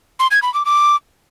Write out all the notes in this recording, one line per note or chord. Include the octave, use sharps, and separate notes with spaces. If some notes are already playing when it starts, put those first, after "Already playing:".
C6
G#6
B5
D6
D6